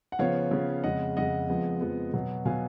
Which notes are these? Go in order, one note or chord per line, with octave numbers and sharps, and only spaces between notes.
F#5
C#3 F3 B3 C#5 F5
C#3 F3 B3
F2 C#3 G#3 D#5 F#5
F2 C#3 G#3 D#5 F#5
F2 F3 G#3 B3
F2 F3 G#3 B3
B2 F#3 B3
B2 F#3 B3 F5 G#5